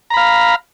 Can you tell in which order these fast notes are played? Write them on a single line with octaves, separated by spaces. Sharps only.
A#5 B5 F5